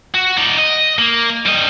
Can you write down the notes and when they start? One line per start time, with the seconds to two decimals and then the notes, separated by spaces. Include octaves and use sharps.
0.14 F#4
0.37 D#4 D5
0.59 D#5
0.98 A#3
1.46 G3 D#5